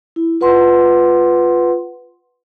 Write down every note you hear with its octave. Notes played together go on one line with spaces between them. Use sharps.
E4
F4 B4 F#5 C6